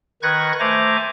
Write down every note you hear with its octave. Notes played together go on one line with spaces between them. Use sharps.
D#3 B4 C#6 F#6 G#6 A#6
A3 C5 G#5 A#5 D6